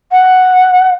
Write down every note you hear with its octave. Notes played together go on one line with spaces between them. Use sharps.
F#5